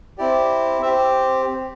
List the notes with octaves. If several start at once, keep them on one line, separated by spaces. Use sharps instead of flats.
C4 E4 G4 D5
C4 G4 E5